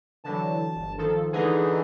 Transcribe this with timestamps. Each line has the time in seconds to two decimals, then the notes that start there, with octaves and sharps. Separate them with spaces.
0.25 D3 E3 F#3 A5
0.75 G1
0.98 D#3 F3 A4
1.32 D3 E3 G#3 D#4 G#4